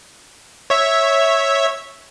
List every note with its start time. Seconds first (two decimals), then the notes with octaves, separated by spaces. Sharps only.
0.70 C#5 E5